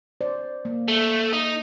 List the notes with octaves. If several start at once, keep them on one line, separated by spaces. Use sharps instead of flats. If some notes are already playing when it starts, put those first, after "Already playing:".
C5 D5
A#3
A3
D#4